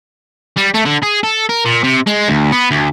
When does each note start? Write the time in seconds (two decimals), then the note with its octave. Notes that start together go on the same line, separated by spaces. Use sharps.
0.57 G3
0.75 A3
0.86 D3
1.03 G#4
1.23 A4
1.49 A#4
1.65 A#2
1.84 C3
2.07 G#3
2.28 D2
2.52 B3
2.71 D2